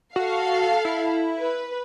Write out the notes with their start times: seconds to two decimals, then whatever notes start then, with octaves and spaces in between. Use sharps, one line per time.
0.16 F#4 A4 F5
0.85 E4
1.40 B4